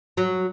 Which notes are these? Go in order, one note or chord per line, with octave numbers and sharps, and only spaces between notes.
F#3